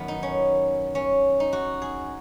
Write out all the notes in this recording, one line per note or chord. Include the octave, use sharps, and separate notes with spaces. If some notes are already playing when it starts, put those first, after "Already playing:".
Already playing: F#2 D#3 B3
D#4
C#4
C#4
D#4
F#4
G#4